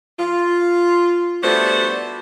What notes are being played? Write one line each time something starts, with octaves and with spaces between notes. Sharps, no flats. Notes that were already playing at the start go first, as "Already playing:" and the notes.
F4
G3 A3 B3 D4 F#4 C5